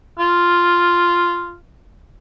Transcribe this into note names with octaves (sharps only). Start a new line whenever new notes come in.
F4